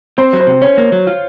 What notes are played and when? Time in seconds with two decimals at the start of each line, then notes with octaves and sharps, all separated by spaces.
0.18 C4 C5
0.33 F#3
0.40 C5
0.47 C3
0.62 C#4 C#5
0.78 A#3
0.92 F#3
1.07 F4